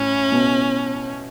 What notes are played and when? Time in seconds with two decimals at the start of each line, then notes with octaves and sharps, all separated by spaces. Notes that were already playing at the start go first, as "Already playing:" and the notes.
Already playing: A2 C#4
0.32 B2